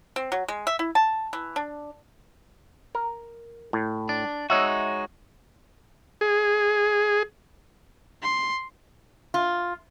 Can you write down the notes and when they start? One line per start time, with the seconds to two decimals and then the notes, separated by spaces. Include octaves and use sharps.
0.16 C4
0.32 F#3
0.48 G#3
0.67 E5
0.79 E4
0.95 A5
1.33 E3
1.56 D4
2.95 A#4
3.73 A2
4.09 D4
4.50 G#3 D#4 F#4 C#5 E5
6.21 G#4
8.22 C6
9.34 F4